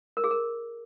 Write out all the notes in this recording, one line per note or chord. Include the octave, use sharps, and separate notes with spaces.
A#4
G#4
A#4